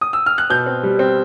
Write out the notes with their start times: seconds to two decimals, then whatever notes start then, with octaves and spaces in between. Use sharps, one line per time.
0.01 D#6
0.13 E6
0.26 F6
0.38 F#6
0.50 B2 G6
0.66 C4
0.83 G3
0.99 C4